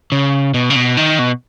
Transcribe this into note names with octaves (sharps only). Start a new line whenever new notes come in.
C#3
B2
C#3
B2
D#3
B2